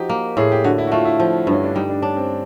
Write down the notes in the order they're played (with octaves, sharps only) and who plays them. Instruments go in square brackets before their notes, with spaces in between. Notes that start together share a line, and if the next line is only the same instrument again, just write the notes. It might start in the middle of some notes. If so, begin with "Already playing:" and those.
Already playing: [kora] F3 D#4 [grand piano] F#4 G4
[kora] A#3
[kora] A2 [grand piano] G#4
[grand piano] G4
[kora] D3 [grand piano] F#4
[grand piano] E4
F#4
[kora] A3 [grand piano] F4
[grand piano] E4
[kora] F3
[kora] G2 [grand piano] C#4
[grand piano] D4
[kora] G3 [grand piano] D#4
[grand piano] D4
[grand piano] C#4 [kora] D4
[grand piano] C4